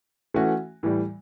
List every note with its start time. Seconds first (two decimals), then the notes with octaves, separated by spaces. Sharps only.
0.34 E3 A3 C#4 F#4
0.83 A2 E3 G3